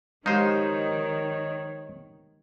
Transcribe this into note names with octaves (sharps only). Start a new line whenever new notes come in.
D#3 G#3 D#4 G4 C5 C#5